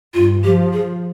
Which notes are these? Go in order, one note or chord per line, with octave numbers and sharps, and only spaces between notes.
G2 F4
F3 G4
G#4